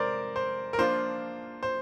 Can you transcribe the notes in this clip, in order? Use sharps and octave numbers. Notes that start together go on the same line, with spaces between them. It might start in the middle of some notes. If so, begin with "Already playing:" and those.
Already playing: C3 G#3 A#4 C5 D5
C5
A#4
F3 A#3 D4 F4 C5
C5